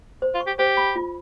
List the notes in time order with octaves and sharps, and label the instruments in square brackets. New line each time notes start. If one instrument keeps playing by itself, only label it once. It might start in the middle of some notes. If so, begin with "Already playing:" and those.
[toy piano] C5
[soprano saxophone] F4
[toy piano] C#6
[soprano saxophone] G4
[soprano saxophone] G4 [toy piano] C5
[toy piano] B5
F4